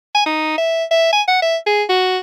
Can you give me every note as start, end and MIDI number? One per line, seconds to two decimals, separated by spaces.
0.15 0.24 80
0.26 0.57 63
0.58 0.85 76
0.91 1.10 76
1.13 1.22 80
1.28 1.38 78
1.42 1.57 76
1.67 1.83 68
1.89 2.18 66